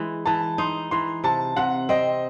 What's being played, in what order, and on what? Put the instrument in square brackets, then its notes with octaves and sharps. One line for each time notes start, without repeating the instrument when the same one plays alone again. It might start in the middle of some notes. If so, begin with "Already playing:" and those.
Already playing: [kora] E3 G#3
[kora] E3 [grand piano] A5
[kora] D#4 [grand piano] C6
[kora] E3 [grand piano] C6
[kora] C3 [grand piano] A5
[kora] C3 [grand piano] F#5
[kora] C4 [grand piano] D#5